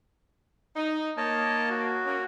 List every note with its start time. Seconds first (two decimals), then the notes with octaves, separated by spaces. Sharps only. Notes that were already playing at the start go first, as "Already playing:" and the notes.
0.76 D#4
1.17 A#3 C#5 D#5 A5
1.70 F#4
2.06 A#3 C#4